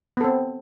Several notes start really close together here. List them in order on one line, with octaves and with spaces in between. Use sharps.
B3 A4 C4